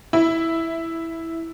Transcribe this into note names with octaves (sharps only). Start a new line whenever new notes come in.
E4